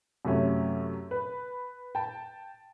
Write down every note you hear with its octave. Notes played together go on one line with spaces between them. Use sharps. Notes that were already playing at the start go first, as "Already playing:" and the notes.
F#2 C3 A3 C#4
B4
G5 A5